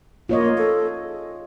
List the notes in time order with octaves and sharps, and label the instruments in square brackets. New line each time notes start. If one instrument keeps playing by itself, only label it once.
[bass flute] A#3 [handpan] F4 C#5 D#5
[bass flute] A4
G#4